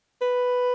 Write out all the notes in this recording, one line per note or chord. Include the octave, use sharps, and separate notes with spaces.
B4